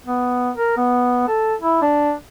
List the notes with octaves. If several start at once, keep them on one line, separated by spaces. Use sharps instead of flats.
B3
A#4
B3
A4
E4
D4